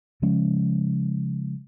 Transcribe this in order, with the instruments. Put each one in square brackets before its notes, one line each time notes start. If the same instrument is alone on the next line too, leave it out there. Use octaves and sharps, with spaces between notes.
[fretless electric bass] C#3 F3 G#3 C#4